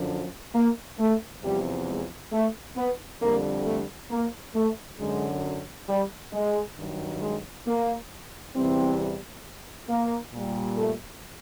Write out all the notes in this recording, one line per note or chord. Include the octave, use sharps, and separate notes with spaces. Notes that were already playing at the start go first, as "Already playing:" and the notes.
Already playing: F#2 D3 F3
A#3
A3
E2 C3 F3 G3
G#3
A3
B3
F2 D3 G3 A#3
A3
A#3
A3
F#2 D3 F#3 G#3
G3
G#3
G2 D#3 F#3
G#3
A#3
E2 C3 E3 G3 C4
A#3
A#2 G3
A3